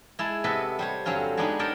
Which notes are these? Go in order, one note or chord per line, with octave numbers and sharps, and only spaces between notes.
G#3 E4 A5
C3 B3 A4 B4 D#5 B5
G3 C5 C#5
G2 D3 F#3 C4 C#4 F4
G#3 B3 D4 D#4 F#4 G4
G4 G#4 A#4 C#5 G5 A5